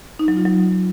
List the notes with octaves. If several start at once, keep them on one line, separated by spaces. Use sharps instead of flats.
D#4
F#3
F4
F#3